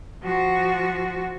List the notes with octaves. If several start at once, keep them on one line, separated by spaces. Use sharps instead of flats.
F3 F#4